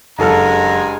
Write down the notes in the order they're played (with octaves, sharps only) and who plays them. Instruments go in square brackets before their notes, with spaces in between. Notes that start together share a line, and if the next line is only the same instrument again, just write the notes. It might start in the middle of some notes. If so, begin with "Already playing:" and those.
[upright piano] F#1 A4 F6 [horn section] G2 G#3 G#5 [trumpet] A#5